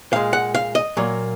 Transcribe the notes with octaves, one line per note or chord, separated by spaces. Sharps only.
A#2 G#3 F5
F#5
F5
D#5
A#2 F#3 A#3